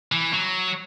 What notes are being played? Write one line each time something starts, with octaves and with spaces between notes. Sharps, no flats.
E3
F#3